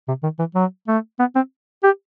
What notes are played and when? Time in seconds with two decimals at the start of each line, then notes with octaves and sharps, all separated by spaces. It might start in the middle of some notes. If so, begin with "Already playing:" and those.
0.08 C3
0.23 D#3
0.39 E3
0.55 F#3
0.88 A3
1.19 B3
1.35 C4
1.84 G4